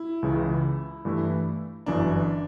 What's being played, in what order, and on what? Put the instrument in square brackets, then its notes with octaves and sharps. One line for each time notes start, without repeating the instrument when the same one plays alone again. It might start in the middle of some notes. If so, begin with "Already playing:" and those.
Already playing: [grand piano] E4
[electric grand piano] C#2 C#3 E3
G2 E3 A3 E4
[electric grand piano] G1 F#2 E3 [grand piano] D4